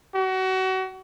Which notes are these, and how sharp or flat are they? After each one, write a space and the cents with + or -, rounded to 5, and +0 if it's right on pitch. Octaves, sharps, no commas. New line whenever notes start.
F#4 +30